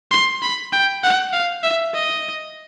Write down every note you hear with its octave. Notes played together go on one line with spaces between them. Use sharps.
C6
B5
G5
F#5
F5
E5
D#5